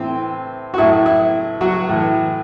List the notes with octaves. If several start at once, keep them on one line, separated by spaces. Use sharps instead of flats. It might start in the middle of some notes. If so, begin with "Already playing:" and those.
Already playing: A2 E3 C4
F#4
A2 F#3 E4
E4
F#3 F#4
A2 E3